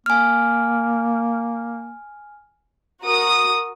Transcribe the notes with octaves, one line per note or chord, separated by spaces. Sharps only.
A#3 G#5 F6
F#4 A#4 D#6